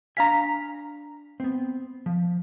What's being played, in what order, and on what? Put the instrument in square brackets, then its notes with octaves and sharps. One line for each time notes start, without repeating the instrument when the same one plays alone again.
[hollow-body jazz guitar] D4 F5 G#5 [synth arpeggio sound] A#5 B6
[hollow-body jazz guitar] B3 C4
F3